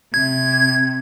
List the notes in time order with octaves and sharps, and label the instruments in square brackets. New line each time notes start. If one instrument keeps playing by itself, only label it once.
[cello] C3 [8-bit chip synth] G#6